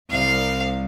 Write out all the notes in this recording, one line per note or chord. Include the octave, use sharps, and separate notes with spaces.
C2 F5